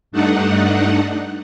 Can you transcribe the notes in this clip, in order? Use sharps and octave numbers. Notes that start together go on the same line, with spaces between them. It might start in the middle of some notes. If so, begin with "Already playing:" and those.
G2 A3 D4 D#4 F#5